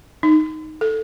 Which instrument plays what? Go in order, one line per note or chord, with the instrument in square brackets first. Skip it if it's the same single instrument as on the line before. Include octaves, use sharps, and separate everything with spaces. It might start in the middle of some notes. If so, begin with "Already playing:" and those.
[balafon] D#4
A4